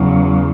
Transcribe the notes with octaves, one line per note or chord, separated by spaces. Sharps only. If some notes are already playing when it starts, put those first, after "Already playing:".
Already playing: E2 C#3 F#3